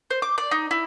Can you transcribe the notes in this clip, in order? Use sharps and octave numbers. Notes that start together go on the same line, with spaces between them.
C5
D6
D5
D#4
E4